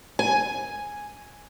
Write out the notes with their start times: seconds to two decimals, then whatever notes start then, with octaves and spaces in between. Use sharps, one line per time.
0.19 G#5